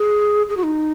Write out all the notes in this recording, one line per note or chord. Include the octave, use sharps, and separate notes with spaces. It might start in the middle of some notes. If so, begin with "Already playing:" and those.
Already playing: G#4
G#4
F#4
D#4